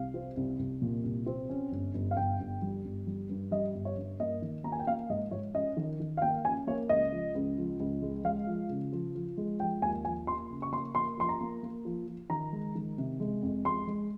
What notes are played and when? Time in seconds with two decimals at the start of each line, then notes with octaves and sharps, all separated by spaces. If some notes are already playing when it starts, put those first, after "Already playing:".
Already playing: C2 F5
0.14 C4
0.37 C2
0.59 C2
0.82 A#2
1.04 C2
1.26 C4
1.50 C#4
1.72 G1
1.94 G1
2.11 F5
2.17 G1 G5
2.40 G1
2.62 G3
2.84 G1
3.07 G3
3.30 G2
3.51 G3 D#5
3.74 G1
3.85 C#5
3.97 G2
4.19 A#3 D#5
4.42 D#3
4.64 A#3 A#5
4.72 G#5
4.79 G5
4.87 A#3 F5
5.10 G#2 D#5
5.31 G#2 C#5
5.54 C#4 D#5
5.77 D#3
6.00 D#3
6.17 F5
6.22 A#3 G5
6.45 C#4 G#5
6.67 A#3 C#5
6.89 C#2 D#5
7.12 F3
7.35 C#2
7.57 F3
7.80 C#2
8.02 G#3
8.24 G#3 F5
8.47 F3
8.69 C#3
8.92 F3
9.15 F3
9.37 G#3
9.60 F3 G5
9.82 D#2 G#5
10.05 F3 G#5
10.27 A#3 C6
10.50 C#3
10.62 C#6
10.72 A#3 C6
10.95 A#3 C6
11.17 F3 C6
11.29 A#5
11.41 A#3
11.63 A#3
11.85 F3
12.07 F3
12.30 D#3 A#5
12.53 G#3
12.75 D#3
12.98 C3
13.20 G#3
13.43 F2
13.65 G#3 C6
13.87 G#3